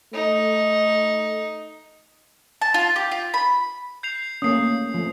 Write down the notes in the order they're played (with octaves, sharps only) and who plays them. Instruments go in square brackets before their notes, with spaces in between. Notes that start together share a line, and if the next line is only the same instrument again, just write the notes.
[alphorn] A3 [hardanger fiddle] D#4
[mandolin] A5
F4
G4
F4
B5
[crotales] G6 C7 F7
[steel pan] A3 A#3 C#4 [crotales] D#6 C7
[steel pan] F3 A3